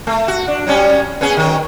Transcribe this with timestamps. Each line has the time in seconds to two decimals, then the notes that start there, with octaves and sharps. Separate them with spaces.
0.07 A3
0.28 F#4
0.48 D4
0.67 F#3 G3 C#4
1.21 B3 C#4 G#4
1.37 D#3 F#3